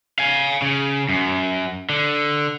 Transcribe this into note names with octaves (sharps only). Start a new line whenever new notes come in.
F5 G#5
C#3
F#2
D3